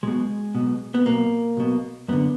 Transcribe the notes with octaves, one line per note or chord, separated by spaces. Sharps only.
B1 B2 G#3
B1 B2
B3
B1 B2 A#3
B1 B2
F#2 D3 B3